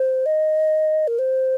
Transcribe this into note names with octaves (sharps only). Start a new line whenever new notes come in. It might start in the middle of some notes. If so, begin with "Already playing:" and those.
Already playing: C5
D#5
A#4
C5